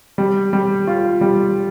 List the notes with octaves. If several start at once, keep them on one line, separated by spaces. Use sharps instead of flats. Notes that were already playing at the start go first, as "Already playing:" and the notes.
G3
G3
F4
G3